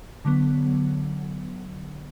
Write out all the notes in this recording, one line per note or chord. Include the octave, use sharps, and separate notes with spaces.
D3 F#3 B3